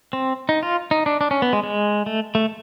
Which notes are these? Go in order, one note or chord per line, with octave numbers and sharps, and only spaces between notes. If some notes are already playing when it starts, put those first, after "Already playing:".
C4
D#4
F4
D#4
D4
D4
C#4
B3
G#3
G#3
A3
A3